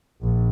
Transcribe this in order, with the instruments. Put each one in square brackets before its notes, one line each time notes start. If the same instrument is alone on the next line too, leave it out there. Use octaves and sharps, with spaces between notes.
[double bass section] A#1